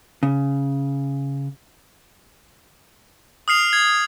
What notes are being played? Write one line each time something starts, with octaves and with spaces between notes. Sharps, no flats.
C#3
D#6 F6 C7 F7
G#6